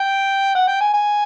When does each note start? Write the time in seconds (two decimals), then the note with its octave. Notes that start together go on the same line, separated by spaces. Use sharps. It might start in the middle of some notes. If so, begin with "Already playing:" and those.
Already playing: G5
0.55 F#5
0.68 G5
0.81 G#5
0.94 G#5